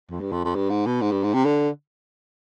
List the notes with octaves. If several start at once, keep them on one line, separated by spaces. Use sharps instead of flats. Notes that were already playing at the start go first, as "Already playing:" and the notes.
F2
G2
F2
F2
G2
G#2
B2
G#2
G2
G#2
C3
D3